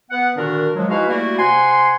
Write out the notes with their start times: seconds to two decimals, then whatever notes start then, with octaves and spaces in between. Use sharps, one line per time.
0.10 B3 F#5
0.36 A#2 D3 D#3 D4 F#4 A#4
0.76 F3 F#3 G#3
0.90 G#3 D#4 E4 F#4 B4 F5
1.08 G3 A3 A#3 E4 F#4
1.39 C3 F#5 G#5 C6